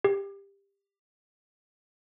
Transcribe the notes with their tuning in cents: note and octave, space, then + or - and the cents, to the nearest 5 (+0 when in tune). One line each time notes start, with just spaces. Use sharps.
G4 +20